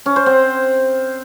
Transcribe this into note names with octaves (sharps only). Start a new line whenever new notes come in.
C#4
C5
C4